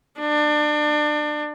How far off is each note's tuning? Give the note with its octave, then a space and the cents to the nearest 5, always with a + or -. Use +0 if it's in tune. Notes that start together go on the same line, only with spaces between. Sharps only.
D4 +30